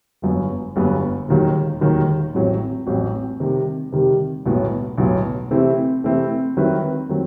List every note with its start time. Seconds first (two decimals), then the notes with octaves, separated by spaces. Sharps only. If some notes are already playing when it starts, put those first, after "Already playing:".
0.22 G1 F#2 F#3 B3
0.76 G1 F#2 F#3 B3
1.28 E1 D#2 D#3 F#3
1.81 E1 D#2 D#3 F#3
2.34 A1 A2 F#3 C4
2.87 A1 A2 F#3 C4
3.40 C3 D#3 G3
3.92 C3 D#3 G3
4.46 B1 A2 F#3 B3
4.98 B1 A2 F#3 B3
5.51 C3 E3 A3 C4 E4
6.04 C3 E3 A3 C4 E4
6.57 D#3 F#3 C4 E4 B4
7.09 D#3 F#3 C4